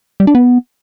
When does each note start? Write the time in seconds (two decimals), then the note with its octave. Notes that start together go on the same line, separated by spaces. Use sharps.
0.20 G3
0.27 D4
0.35 B3